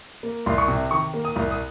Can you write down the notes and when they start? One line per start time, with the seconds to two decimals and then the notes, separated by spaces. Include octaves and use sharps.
0.23 A#3
0.46 C2 C6
0.58 C#6
0.68 C3
0.91 D#3 C#6
1.14 A#3
1.25 D#6
1.36 C2
1.51 D#6